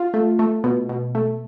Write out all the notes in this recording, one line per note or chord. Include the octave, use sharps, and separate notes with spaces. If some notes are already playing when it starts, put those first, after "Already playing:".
Already playing: F4
A3
A3
B2
B2
A3